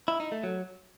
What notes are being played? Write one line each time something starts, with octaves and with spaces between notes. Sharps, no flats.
E4
D#4
A3
F#3